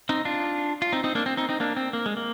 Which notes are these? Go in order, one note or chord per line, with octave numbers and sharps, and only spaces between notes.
C4 D#4
D4 F4
F4
C4 D#4
C4 D#4
A#3 D4
C4
C4 D#4
C4 D#4
A#3 D4
C4
A#3
G#3
A#3